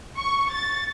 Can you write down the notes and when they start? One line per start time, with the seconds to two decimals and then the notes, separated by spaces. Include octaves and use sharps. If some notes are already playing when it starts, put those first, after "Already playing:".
0.19 C#6
0.53 A6